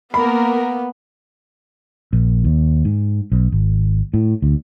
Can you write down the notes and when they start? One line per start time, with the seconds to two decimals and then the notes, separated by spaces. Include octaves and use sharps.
0.14 A#3 B3 A#4 B5
2.13 A#1
2.44 D#2
2.85 G#2
3.32 B1
3.52 G#1
4.14 A2
4.42 D2